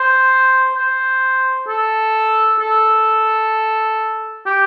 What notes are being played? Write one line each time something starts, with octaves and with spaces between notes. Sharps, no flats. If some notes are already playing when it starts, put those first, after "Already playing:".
Already playing: C5
C5
A4
A4
G4